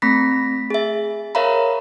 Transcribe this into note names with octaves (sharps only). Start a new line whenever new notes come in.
A3 C4 B5 A#6 B6
G#4 E5
A#4 C#5 E5 F5 A#5 B5